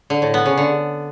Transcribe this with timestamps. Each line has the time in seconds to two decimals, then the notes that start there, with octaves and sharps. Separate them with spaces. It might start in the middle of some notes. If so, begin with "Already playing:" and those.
0.10 D3
0.22 A2
0.34 B3
0.46 C#3
0.57 D3